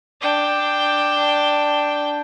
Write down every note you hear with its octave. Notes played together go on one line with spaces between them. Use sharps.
D4 G5